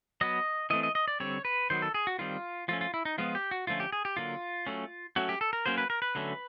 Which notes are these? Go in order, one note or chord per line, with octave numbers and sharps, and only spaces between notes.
F#3 B3 D#5
E3 A3 C4 D#5
D#5
D#5
D5
D3 G3 C4 C#5
B4
D#3 F#3 B3 C5
A4
G#4
F#4
D#3 G3 C4 F4
F3 A3 C#4 F4
F4
E4
D#4
F3 G#3 B3 F4
G4
F#4
D3 F3 A3 C#4 F4
G4
G#4
G4
D3 F#3 A#3 F4
F#3 A3 C#4
F#3 A3 C#4 F#4
G4
A4
A#4
F#3 A#3 C#4 C5
B4
A#4
B4
D3 F#3 A3 C#4